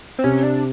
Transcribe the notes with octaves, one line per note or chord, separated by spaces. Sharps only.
C4
C3 C#4
D4